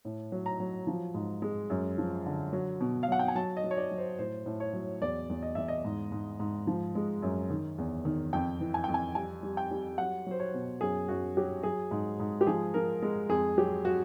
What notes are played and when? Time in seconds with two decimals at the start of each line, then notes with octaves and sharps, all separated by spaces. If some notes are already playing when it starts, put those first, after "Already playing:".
0.05 A2
0.32 F#3
0.46 A#5
0.60 F#3
0.87 F3
1.14 G#2
1.42 G#3
1.70 F#2
1.98 F3
2.26 D3
2.53 F#3
2.81 B2
3.03 F5
3.08 F#3 F#5
3.19 G5
3.28 G#5
3.35 F#3 A5
3.57 D#5
3.64 F#3
3.71 C#5
3.77 D5
3.91 F#3
3.98 C5
4.19 A2 C5
4.46 A2
4.60 C#5
4.73 F#3
5.02 E2 D5
5.29 E2
5.42 D#5
5.55 E2 E5
5.68 D#5
5.85 G#2
6.12 G#2
6.40 G#2
6.67 F3
6.95 G#3
7.22 F#2
7.50 D#3
7.78 E2
8.05 D#3
8.33 F2 G5
8.61 E3
8.74 G#5
8.84 F2 G5
8.94 G#5
9.15 G3 G#5
9.43 G3
9.57 G5
9.71 G3
9.98 F#3 F#5
10.27 F#3 C5
10.40 C#5
10.54 B2
10.81 F#2 G#4
11.08 F#2 F#4
11.37 F#3 G4
11.63 F#3 G#4
11.91 G#2
12.20 G#2
12.41 G4
12.47 F3 G#4
12.74 F3 A#4
13.02 G#3
13.29 F2 G#4
13.58 F#3 G4
13.85 F#3 F#4